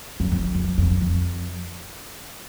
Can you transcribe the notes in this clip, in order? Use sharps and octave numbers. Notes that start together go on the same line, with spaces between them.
F#2
F2
F2
F2
F2